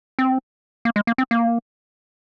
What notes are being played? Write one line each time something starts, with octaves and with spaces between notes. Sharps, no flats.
C4
A#3
G#3
A#3
C4
A#3